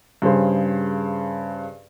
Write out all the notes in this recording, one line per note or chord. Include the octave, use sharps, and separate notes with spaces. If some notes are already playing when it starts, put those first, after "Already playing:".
G2 C#3 G#4 C5